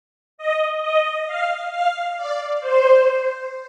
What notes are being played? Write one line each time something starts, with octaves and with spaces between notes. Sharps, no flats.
D#5
D#5
F5
F5
D5
C5